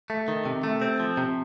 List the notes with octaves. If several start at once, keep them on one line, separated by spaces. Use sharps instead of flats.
A3
D#3
C3
A3
C4
F3
C3